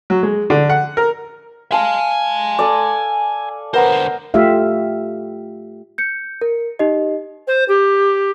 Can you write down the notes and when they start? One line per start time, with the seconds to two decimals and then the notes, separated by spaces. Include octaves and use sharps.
0.10 F#3
0.23 G#3
0.50 D3
0.70 F#5
0.97 A#4
1.72 F5 G#5 A5 C6
2.59 A4 D5
3.74 D3 B3 A#4 C5
4.34 A3 F4 G4 E5 F5
5.98 G6 C#7
6.41 A#4
6.79 D#4 G4 D#5
7.47 C5
7.68 G4